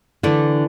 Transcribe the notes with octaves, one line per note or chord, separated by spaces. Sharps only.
D3 E3 A3 D4